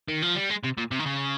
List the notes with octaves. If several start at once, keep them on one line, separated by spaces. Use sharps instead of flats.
D#3
F3
G3
G#3
C3
A#2
C3
D#3
C#3